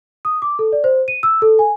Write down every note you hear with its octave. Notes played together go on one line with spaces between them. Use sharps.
D#6
D6
A4
D5
C5
D#7
E6
A4
G#5